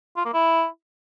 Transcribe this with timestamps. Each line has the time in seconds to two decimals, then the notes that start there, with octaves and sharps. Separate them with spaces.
0.17 F4
0.25 A#3
0.34 E4